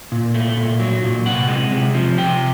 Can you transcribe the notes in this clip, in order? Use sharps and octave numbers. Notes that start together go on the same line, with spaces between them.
A#2
A3
A#2
F#3
A#2
C3 F#5
G#3
C3
F3
C3 G5